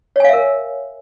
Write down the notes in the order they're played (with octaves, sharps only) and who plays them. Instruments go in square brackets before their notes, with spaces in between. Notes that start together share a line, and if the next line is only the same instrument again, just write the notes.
[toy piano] C#5
G#5
F5
E5
A#4